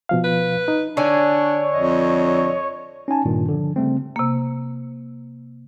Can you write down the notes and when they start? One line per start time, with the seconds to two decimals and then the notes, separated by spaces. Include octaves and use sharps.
0.09 B2 F3 F5
0.24 B4
0.68 D#4
0.97 D3 D4 C#5 G#5
1.74 F2 D#5
3.08 C#4 D#4 G#5 A5
3.25 G2 A#2 D#3
3.49 D3 F3
3.76 C#3 G3 A3 C4
4.16 C3 A#3